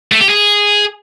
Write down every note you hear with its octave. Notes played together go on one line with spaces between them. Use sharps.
A3
G4
G#4